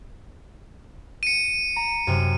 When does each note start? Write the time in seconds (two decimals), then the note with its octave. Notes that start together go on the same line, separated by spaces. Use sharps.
1.23 C#7 D#7
1.76 A#5
2.07 F#2 C3